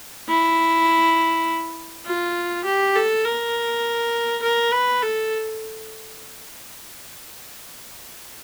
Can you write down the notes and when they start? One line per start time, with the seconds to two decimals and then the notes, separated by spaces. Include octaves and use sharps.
0.29 E4
2.06 F4
2.65 G4
2.96 A4
3.25 A#4
4.42 A#4
4.72 B4
5.02 A4